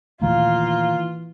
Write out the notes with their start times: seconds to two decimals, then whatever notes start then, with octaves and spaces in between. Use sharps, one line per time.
0.22 A#2 D#3 E3 A3 A#3 F4